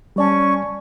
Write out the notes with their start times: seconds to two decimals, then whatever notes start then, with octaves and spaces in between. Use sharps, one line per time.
0.16 G3 C#4 D5 A5 C#6